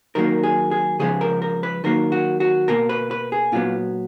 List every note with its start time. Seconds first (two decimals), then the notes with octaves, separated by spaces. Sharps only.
0.15 D#3 F#3 A#3 A#4
0.43 G#4
0.71 G#4
0.99 C#3 F3 G#3 B3 G#4
1.21 A#4
1.42 A#4
1.63 B4
1.84 D#3 F#3 A#3 A#4
2.12 F#4
2.40 F#4
2.68 B2 A#3 A#4
2.89 B4
3.11 B4
3.32 G#4
3.52 A#2 F#3 B3 F4